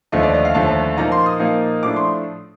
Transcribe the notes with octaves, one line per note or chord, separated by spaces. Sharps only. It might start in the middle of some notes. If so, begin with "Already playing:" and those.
D#2 D3 F3 A3 D#5
D5
D#5
F5
D#2 D3 F3 A3 A5
A#2 F3 A#3 D#4 A#5
C6
D#6
A#2 F3 A#3 D#4
A2 F3 A3 D4 D6
C6